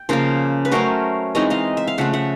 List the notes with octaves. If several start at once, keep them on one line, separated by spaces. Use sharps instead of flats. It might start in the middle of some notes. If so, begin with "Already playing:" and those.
Already playing: G5
C#3 F3 A#3 A#4 C5
B4
F#3 A3 C#4 A#4 C5
E3 G#3 C4 D#4 C#5 D#5
D#5 F5
E5
F5
C#3 F3 A3 E5 F#5
E5 F#5